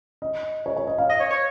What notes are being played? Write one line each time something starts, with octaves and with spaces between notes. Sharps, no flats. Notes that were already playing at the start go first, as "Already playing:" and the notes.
D#5
C#5
C#5
D#5
F5
D#5
C#5
C#5